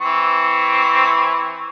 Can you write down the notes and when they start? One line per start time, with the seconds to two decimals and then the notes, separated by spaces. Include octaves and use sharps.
0.01 E3 C4 C#6